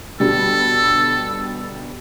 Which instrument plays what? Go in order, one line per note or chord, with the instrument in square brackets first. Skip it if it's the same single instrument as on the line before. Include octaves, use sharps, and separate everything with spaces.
[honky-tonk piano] B2 D3 G3 [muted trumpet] A4